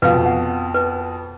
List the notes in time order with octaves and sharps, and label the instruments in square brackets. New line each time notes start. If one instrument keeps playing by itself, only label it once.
[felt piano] F2 B2 [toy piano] B4 F5
[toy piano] F#5
B4